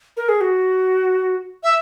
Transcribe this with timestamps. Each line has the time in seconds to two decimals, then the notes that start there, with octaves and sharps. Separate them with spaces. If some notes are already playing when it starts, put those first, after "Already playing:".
0.17 A#4
0.29 G#4
0.41 F#4
1.63 E5